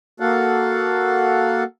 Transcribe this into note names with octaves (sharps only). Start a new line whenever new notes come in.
A#3 F#4 A4 F5 F#5